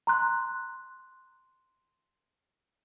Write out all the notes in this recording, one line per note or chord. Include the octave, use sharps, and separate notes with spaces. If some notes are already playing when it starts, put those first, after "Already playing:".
A#5 C6 F#6